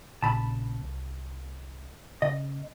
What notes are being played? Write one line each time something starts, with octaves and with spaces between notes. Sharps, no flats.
A#1 A#2 C#3 A5 B5
C2
C#3 D#5